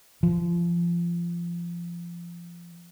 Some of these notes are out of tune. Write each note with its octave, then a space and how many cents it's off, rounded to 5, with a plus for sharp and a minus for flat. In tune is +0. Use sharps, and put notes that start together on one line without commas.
F3 -25